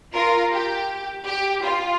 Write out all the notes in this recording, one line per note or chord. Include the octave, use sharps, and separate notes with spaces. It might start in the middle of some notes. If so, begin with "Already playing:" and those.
F4 A#4
G4
G4
F4